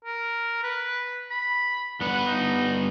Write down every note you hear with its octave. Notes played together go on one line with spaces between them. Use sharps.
A#4
B4
B5
G2 B3 B4 F#5
D#4